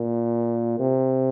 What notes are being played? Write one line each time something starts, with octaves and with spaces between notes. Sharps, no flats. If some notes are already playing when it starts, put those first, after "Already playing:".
Already playing: A#2
C3